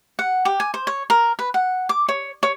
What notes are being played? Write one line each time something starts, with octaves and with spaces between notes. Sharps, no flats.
F#5
G4
G#5
C5
C#5
A#4
B4
F#5
D6
C#5
C#5